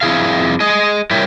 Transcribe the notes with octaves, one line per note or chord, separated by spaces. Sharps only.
F2 E4 G#4 F5
G#4 D#5
G3 E4 A#4 C#5 E5 G5